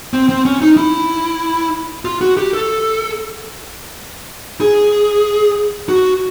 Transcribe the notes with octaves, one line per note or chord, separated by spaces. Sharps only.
C4
C4
C#4
D#4
E4
F4
F#4
G4
A4
G#4
F#4